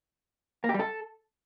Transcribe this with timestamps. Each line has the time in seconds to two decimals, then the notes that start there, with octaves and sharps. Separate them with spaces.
0.64 A#3
0.69 G4
0.74 G3
0.79 A4